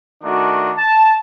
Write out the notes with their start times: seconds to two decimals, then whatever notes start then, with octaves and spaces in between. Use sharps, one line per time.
0.24 D#3 A3 D4 F#4
0.78 A5